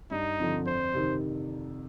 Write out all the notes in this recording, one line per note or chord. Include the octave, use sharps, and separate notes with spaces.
G2 D#4
D3 F3 C4
F2 C5
C3 D#3